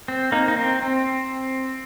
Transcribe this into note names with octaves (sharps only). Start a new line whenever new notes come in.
C4
A#3 D#4
D#4
C4
C4